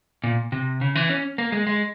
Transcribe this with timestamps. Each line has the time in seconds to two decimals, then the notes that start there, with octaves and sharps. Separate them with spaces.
0.24 A#2
0.52 C3
0.81 C#3
0.95 E3
1.10 C#4
1.38 A#3
1.52 G#3
1.67 G#3